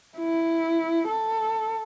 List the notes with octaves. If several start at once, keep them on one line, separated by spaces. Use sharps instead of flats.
E4
A4